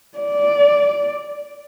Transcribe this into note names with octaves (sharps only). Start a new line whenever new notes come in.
D5